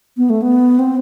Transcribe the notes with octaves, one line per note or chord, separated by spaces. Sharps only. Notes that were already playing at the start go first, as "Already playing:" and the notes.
B3
A3
B3
C4